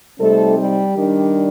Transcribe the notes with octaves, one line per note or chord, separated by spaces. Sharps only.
C3 G3 A3 C4 D#4 A4
G3 G4
D#3 G3 D4